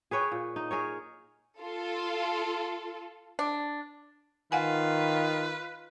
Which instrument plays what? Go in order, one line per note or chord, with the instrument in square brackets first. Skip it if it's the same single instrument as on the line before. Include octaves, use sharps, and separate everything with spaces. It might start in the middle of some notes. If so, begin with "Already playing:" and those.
[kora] G#4 B4 C#5 G5
A#2
D#4
G#4 A#4 C#5
[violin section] F4 A4
[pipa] D4
[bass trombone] D#3 [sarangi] F4 [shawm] B4 [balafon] F5 F#5 G#5